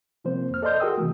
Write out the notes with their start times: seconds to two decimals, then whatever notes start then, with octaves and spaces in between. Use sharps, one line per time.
0.24 C3 F3 A#3 C4 C5
0.50 F2 F6
0.62 A4 D5 D#5 A5 C6 G6
0.80 F#4 G#4 A#4 G5 D#6 E6
0.98 C3 E3 A3